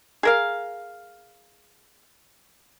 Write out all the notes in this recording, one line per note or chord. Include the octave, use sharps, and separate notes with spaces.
G#4 A#4 F5